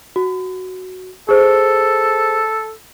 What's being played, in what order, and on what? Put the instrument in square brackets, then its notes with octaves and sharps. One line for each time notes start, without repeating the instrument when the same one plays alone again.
[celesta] F#4
[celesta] G#4 C5 [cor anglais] A4